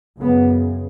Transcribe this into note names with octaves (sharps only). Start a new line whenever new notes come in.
F#2 C#3 B3